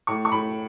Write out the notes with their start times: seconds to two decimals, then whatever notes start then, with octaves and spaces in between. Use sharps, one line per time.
0.07 A2 C#6
0.25 C#6
0.32 A2 B5